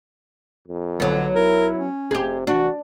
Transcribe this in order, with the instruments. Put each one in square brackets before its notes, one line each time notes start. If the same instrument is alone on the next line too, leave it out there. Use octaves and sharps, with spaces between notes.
[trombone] F2
[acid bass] B1 [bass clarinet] D3 [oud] F#3 B3
[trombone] E4 [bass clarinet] A#4
[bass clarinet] C#4
[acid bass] F1 [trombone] C3 [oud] G4 G#4
[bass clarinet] E3 [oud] D4 [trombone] F#4